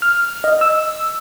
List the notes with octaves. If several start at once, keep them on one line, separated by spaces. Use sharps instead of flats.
F6
D#5
E6